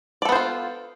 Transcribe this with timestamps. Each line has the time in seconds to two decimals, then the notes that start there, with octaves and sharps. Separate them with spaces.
0.22 D5
0.25 A4
0.29 B3
0.32 C5
0.35 F4